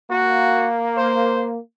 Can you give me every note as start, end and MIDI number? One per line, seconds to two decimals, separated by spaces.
0.11 1.59 58
0.11 0.67 66
0.98 1.48 72